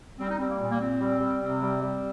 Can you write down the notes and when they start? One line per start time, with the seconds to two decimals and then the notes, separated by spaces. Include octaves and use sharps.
0.18 G3 C4
0.28 D#4
0.38 G3 C4
0.49 A#3
0.59 A#2
0.69 A#3
0.79 A#2 C4
1.00 G3
1.20 G3
1.41 C3 C4
1.61 G3
1.82 G3